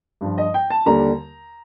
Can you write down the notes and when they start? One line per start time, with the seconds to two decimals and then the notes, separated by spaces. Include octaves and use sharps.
0.21 G2 F3
0.38 D#5
0.54 G5
0.70 A5
0.86 D#2 D3 G3 A#5